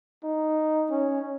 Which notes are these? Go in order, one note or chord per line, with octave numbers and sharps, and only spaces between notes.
D#4
C#4